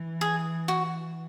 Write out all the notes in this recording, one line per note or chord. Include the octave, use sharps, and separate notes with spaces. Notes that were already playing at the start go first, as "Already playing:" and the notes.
Already playing: E3
G#4
F#4